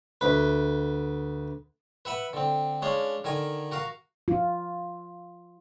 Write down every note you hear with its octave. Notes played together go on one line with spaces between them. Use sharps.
D2 B4
B4 E5 F#5 B5
D3 C4
G#3 C#4 D4 F5
D3 D#3 A#4 G#5
F#4 A#4 F5
F4